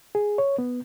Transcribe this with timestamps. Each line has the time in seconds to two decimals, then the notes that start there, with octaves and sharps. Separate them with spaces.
0.15 G#4
0.38 C#5
0.58 B3